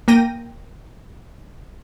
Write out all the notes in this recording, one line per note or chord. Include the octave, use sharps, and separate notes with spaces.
A#3 A#4 G5 A#6 D#7